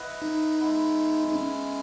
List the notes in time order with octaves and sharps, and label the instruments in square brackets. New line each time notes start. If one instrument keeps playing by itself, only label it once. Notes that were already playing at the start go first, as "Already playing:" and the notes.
Already playing: [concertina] E4 B4 D#5 F#5
[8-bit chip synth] D#4
[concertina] G#3 B3 E4
[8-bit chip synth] D#4
C#4